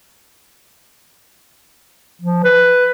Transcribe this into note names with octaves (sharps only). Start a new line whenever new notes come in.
F3
B4